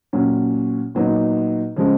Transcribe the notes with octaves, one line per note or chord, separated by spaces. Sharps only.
A#2 F#3 C#4
A#2 F#3 B3 D#4
C#3 F3 G#3